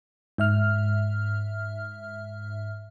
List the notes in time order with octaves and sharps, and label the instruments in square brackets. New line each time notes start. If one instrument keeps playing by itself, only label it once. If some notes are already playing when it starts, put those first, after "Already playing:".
[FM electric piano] G#2 E5 F6